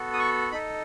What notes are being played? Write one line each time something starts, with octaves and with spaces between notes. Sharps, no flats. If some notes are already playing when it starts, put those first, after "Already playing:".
Already playing: B3 F#4 A4
D#6
C#6
D#4 A4 B5